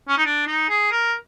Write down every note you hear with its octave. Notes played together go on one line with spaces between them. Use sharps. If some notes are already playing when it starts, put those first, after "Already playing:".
C#4
D#4
D4
D#4
G#4
A#4